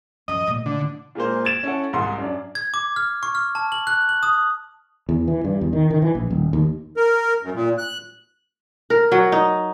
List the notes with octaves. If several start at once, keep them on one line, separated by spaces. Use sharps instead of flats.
F#2 F3 D#5
A#2 A3
D3
A#2 G#3 A#3 C5
G#6 A6 D7 E7
C#4 E4 A4 F#5
C2 G#2 F#5 C6
F#2 D4
G#6
D6
F6
C#6
F6
A5
F#7
F#6
F#7
D#6
E2
E3
G2
E2
D#3
D#3
E3
A#1
D#1
D#2
A#4
F#2
A#2
F#6
A#4
F#3
D#4